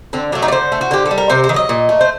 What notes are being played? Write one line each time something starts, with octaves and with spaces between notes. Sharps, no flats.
D3 C4
F#3 A3 D4
D#4
D5
D3 C5
A3
F#4
D3 G4
A4
G3
A#4
C3 C5
C5
D#3
F#3 D#5
A#2
A3
C5